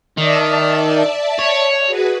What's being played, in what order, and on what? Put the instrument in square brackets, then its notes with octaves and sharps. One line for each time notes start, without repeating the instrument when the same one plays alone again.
[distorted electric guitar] D#3 [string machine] D5 E5 A5
[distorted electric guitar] C#5
[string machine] F#4 G#4 B4